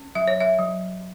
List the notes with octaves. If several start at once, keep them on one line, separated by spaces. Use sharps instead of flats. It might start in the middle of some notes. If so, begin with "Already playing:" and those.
Already playing: C#4
F#3 E5
C#5
E5
F#3